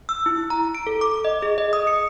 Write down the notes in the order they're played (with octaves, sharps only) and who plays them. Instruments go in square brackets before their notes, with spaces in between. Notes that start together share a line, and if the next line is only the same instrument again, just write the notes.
[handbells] E6
E4
A#5
D7
A4
D6
D#5
G#4
D#5
D#6
C#7